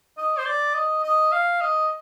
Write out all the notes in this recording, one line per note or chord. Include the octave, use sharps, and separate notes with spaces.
D#5
C5
D5
D#5
D#5
F5
D#5